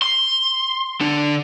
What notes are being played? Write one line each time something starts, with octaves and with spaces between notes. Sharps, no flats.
C6
D3 D4